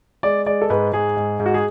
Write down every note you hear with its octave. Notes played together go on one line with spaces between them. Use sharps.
G#3 D5
G#3 D5
A4
G#2 B4
G#2 G#4
G#2
G#2
F#4
G#4